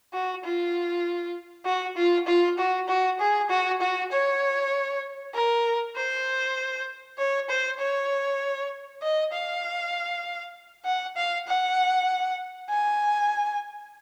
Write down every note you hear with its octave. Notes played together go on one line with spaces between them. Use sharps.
F#4
F4
F#4
F4
F4
F#4
F#4
G#4
F#4
F#4
C#5
A#4
C5
C#5
C5
C#5
D#5
F5
F#5
F5
F#5
G#5